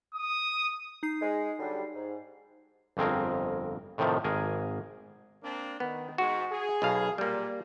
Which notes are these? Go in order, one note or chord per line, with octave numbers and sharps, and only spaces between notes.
D#6
D#4 C7
G#3
D3 F#3 G3
G#2
G1 F2 C4 G#4 A#4
A2 C3 D#3 F3
G#1 G#4 A#4 G#5
A#3 C4 D4
D#3 B3
G#2 F#4
G#4
B1 B2 F5
A#2 G3 A#3